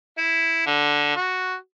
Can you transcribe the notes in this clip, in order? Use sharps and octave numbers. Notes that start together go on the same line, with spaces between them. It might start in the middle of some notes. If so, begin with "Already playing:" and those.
E4
D3
F#4